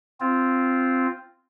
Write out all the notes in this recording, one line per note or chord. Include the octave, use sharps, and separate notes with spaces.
C4 F4